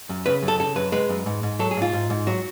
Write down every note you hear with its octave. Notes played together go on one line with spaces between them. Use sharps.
F#2
C#3 B4
F#2
A4
C#3 A4
F#2 B4
G#3 B4
F#2
G#2
G#2
F#3 A4
G#4
G#2 F4
G#2
G#2
F#3 F#4